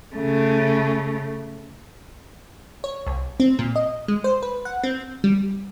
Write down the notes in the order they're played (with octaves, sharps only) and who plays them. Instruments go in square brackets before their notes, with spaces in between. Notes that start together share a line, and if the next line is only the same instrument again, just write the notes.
[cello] C#3 A3
[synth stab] C#5
C2
C4
A#2
D#5
G#3
C5
B4
F#5
C4
G3